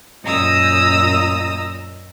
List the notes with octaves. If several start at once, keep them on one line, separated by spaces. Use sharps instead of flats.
F#2 A#2 D#5 A#5 D#6 E6